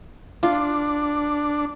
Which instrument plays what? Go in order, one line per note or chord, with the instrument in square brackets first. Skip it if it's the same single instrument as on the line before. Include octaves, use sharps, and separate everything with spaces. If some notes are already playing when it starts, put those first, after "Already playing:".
[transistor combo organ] D4 [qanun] F4